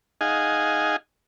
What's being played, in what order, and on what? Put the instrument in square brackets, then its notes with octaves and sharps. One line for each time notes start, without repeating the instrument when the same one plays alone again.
[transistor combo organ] D#4 G#4 D#5 F5 F#5 G#5